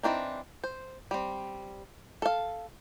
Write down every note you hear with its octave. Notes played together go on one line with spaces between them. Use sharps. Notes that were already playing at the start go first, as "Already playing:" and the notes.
E3 F#3 C4 D4 D#4
C5
G3 C4
A4 F5